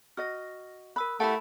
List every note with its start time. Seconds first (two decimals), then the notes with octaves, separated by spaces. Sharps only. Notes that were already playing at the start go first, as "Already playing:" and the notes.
0.17 F#4 D#5 F6 A#6
0.96 A#4 B5 E6 F#6
1.20 A3 E4 G4 F#5 A5 B5